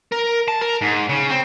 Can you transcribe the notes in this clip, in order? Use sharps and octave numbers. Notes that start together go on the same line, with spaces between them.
A#4
A5
A#4
G#2
C#3
C4